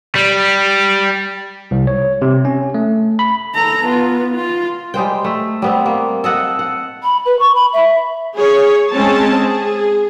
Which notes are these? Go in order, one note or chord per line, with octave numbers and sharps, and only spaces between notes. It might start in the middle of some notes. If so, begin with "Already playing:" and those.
G3
C2
C#5
C3
C#4
A3
B5
A4 A#5
B3 F4
F4
G3 G#3 C5 G5
A3
G3 B3 C4
A#3
A4 D#5 F#5
F#5
B5
B4
C#6
B5
E5
G#4 C#5
G#3 C4 C#4 A5
G#4